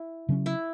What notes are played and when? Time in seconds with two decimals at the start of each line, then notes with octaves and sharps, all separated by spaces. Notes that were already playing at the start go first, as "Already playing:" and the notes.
Already playing: E4
0.29 C#3 F#3 C#4
0.46 E4